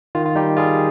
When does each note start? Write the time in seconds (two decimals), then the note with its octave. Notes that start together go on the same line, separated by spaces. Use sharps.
0.15 D#3 F4
0.26 F4
0.35 G3 D#4 G4
0.57 G3 F4 G#4